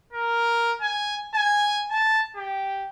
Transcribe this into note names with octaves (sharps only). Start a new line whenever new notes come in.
A#4
G#5
G#5
A5
G4